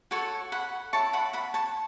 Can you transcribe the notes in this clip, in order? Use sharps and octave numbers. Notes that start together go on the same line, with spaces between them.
F#4 A4 C#5 A5 C#6
F#5 B5
E4 C#5 A5 C#6
F#5 B5
F#5 B5
A5 C#6